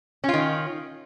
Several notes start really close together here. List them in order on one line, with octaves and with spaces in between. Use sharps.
C#4 F4 D#3